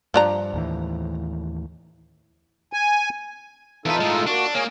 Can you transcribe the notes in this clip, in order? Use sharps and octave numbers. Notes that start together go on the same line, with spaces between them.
G2 F3 D4 A#5
D#2 A2 E3
G#5
E2 D#4 F4 A4 B4
A2 G#3
A#3 D4 F#4
A#3 G#4 C#5